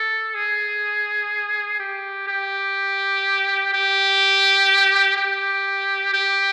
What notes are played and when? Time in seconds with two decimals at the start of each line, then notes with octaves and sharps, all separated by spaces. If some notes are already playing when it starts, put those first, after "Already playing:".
Already playing: A4
0.35 G#4
1.80 G4
2.27 G4
3.73 G4
5.17 G4
6.13 G4